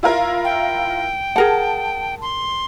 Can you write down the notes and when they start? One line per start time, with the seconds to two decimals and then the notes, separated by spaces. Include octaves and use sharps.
0.03 E4 F4 A#4
0.44 G5
1.36 G#4 A#4 F#5 A5
2.22 C6